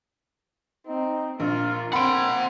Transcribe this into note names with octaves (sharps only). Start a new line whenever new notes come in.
C4 D#4
A#1 A#3 F4
C4 F#5 B5 C6 D7